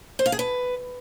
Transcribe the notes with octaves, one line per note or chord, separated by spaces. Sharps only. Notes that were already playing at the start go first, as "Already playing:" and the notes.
C5
F5
G#4
B4